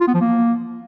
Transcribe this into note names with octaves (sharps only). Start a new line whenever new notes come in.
F4
B3
F3
A#3